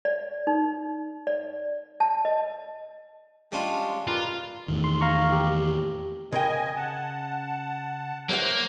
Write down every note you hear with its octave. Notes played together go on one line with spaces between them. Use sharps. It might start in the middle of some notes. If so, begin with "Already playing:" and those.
D5
D#4
D5
A5
D#5
G3 G#3 C#4 D4 F4
F4 A#4 B4 D5
E2 A2 D#3
C6
F5 A#5 C#6
G4
C#3 A#4 D#5 G5 G#5
F#5 A5
F#3 A#3 C5 E5 F#5